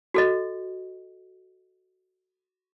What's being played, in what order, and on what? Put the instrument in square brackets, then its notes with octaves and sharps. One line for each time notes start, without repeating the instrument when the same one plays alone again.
[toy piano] F#4 A4 D#5